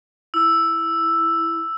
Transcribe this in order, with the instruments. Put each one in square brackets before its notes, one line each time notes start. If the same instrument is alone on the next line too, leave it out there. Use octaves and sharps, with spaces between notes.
[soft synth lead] E4 [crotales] E6